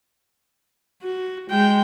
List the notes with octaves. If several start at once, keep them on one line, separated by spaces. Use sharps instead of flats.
F#4
G#3 G5